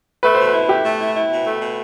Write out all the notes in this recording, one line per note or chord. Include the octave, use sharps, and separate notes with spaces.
A3 B4
B2 C5
B4
E4
A3 G4
A3
E4
E4
B2
A3
B2